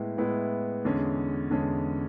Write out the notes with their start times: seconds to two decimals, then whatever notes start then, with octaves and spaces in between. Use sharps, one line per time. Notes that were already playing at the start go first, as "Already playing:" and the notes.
Already playing: A2 G#3 B3 E4
0.17 A2 G#3 B3 E4
0.85 E2 D3 G#3 C#4
1.50 E2 D3 G#3 C#4